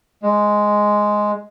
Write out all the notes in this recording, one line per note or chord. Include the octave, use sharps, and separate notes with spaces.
G#3